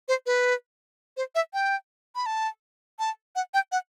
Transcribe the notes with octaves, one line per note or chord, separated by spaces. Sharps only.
C5
B4
C5
E5
G5
B5
A5
A5
F#5
G5
F#5